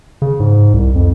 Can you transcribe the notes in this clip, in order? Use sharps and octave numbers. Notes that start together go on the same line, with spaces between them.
C#3
G#2
C2
F2